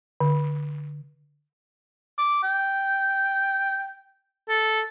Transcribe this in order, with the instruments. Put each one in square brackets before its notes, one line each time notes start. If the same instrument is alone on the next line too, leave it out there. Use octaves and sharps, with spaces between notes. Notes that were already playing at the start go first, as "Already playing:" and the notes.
[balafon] D3
[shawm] D6
G5
A4